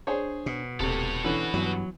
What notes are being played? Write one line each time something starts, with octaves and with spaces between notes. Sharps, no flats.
D4 G#4 C5 C#5
B2
D#1 C3 A3 A4 C#5
D3 E3 C#4 F#4 B4
G2 E3 F#3 B3